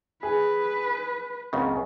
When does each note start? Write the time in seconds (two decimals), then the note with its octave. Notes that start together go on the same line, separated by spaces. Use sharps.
0.23 G#4 B4
1.53 C#2 F#2 C#3 C4